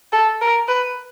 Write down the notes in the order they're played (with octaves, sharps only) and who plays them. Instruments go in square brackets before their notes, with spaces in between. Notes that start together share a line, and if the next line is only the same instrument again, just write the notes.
[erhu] A4
A#4
B4